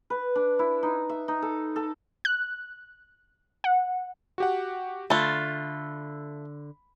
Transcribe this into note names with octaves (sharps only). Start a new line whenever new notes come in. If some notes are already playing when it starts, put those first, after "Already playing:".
B4
D4
E4
D#4
E5
D#4
A4
A4
F#6
F#5
F#4 G4 F#5
D3 A3 F4 B5